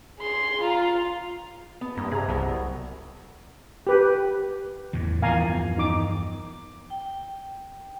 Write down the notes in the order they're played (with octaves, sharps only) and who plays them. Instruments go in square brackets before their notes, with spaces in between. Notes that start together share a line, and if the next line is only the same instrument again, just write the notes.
[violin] G#4 C6
F4 A#5
[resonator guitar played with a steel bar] B3
[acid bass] G2 [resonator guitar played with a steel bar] A#3
[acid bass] C3 [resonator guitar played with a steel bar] G#4 A#5
[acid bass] C2 [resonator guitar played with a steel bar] F#3 B3
[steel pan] G4 B4
[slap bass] E2 A2
[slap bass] E2 G2 F3 [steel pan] F5 G#5 A#5
[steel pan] D#4 D6
[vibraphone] G5